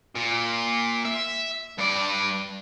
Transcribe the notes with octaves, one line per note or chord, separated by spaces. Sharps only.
A#2
E5
G2 D5